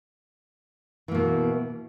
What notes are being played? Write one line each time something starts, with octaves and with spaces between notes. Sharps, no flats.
B2 E3 A#3